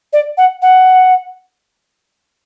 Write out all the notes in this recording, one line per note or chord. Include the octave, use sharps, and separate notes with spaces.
D5
F#5
F#5